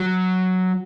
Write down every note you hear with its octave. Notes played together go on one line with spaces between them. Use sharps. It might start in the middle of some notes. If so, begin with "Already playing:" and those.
Already playing: F#3